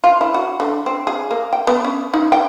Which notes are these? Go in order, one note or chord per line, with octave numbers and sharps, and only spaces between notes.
F4
E4
F#4
D3
C4
G#4
A#3
G5
B3
C#4
D#4
G5